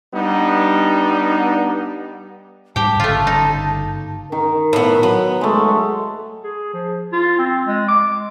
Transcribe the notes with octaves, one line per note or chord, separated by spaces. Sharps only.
G3 B3 D4 D#4
G#2 G3 G#3 G4 G5 A5
G1 C#3 A3 F4
D#4
D#3 A#4
A2 B3
F#3 B3
G#3 A3 G#4
G#4
F3
F4
C4
G#3
D6